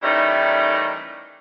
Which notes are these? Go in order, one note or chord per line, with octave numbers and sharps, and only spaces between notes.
D#3 E3 G3 A3 C#4 D#4